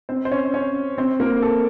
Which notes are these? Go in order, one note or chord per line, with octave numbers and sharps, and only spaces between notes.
C4 C5
C5
C#4 C#5
C#4 C#5
C4 C5
A#3 A#4
A4